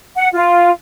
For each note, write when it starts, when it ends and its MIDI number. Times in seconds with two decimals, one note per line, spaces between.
0.15 0.29 78
0.33 0.70 65